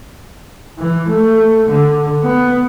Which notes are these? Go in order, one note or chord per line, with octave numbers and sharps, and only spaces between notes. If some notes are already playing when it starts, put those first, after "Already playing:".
E3
A3
D3
B3